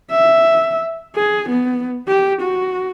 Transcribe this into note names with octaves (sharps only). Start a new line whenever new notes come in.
E5
G#4
B3
G4
F#4